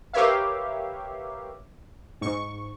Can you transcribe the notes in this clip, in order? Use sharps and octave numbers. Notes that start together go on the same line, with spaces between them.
G4 A#4 B4 C#5 E5 F5
G#2 C#6